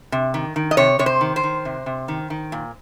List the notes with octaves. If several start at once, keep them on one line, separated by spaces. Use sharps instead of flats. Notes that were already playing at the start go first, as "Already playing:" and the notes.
C3
D#3
D#3
D#5
C3 C#5
C3 C#5
C5
D#3
C5
D#3
C3
C3
D#3
D#3
A#2